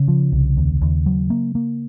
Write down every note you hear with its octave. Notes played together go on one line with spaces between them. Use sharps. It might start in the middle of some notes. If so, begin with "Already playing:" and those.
Already playing: C#3
F3
C2
D#2
D#2
F#3
A#3
A#3